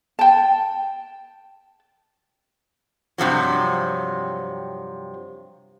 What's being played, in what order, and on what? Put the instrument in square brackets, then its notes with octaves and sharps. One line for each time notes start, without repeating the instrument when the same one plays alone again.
[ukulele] G5 A5
[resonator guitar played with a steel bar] G2 C3 F3 F#3